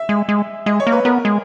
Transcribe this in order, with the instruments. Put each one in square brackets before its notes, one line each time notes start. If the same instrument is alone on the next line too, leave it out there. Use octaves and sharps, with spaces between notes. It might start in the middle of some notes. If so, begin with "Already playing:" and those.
Already playing: [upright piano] E5
[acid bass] G#3
G#3
[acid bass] G#3 [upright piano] D#5
[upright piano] C#5
[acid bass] A#3
[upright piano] B4
[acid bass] B3 [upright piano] A#4
[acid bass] G#3